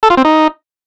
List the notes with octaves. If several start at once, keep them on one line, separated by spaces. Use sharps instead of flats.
A4
F4
C4
D#4